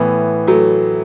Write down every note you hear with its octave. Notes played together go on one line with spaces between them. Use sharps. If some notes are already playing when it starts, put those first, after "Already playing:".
Already playing: A2 E3 B3
F#3 A3